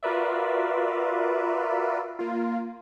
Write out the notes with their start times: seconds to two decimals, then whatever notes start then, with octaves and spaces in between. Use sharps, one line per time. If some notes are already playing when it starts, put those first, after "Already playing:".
0.03 F4 F#4 A#4 B4 D5 E5
2.19 A#3 F4